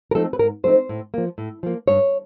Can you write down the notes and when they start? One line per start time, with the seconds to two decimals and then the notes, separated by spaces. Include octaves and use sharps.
0.11 A#4
0.15 F3 A3 C4 D#4 A4
0.33 B4
0.39 G#2 A#4
0.64 F3 A3 C4 D#4 C5
0.89 A2
1.14 F3 A#3
1.38 A2
1.63 F3 A#3
1.88 G2 C#5